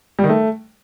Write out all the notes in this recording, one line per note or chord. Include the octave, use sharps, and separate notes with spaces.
G3
D#3
A3